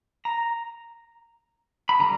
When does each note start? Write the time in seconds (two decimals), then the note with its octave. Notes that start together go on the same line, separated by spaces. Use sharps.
0.25 A#5
1.89 B5
1.99 D3 G3 A#5